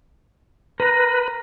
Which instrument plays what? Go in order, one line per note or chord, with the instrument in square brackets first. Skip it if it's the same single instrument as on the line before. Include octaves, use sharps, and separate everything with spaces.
[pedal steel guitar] A#4 A#5 [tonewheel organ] B4